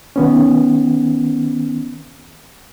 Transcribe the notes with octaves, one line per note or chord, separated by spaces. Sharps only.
D#3 B3 C#4